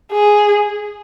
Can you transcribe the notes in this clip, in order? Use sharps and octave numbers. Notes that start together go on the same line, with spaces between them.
G#4